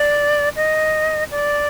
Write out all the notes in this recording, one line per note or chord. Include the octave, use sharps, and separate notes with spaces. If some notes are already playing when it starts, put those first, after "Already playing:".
Already playing: D5
D#5
D5